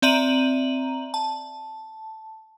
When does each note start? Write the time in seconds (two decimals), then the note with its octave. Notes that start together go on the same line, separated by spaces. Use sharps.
0.02 C4 D5 E5 A#5 D#7 F#7
1.14 A5